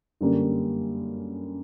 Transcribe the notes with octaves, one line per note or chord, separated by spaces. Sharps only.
F#2 D3 G3 A#3 C#4